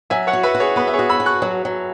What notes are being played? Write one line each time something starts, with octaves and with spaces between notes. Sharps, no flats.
F#3 E5 G#5
C#5 F#5
F#4
B4 E5
F#4
G#4 C#5
B3 B4
E5
G#4 C#5
F#4
B5 E6
F#4
C#6 F#6
F#3
F#3